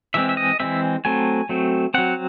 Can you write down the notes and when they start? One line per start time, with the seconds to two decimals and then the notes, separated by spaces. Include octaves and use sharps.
0.14 E3 G#3 C4 E5
0.29 E5
0.37 D#5
0.60 E3 G#3 C4 E5
1.05 F#3 A3 C4 G#5
1.49 F#3 A3 C4
1.94 F#3 C4 F#5